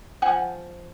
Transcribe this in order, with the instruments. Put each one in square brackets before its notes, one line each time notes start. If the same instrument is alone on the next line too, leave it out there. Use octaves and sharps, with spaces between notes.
[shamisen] F3 F#5 G#5